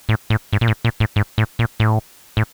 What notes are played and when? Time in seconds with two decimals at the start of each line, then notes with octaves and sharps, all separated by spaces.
0.09 A2
0.30 A2
0.53 G#2
0.61 A#2
0.68 A2
0.85 A#2
1.00 A2
1.16 G#2
1.38 A2
1.59 A#2
1.80 A2
2.37 A2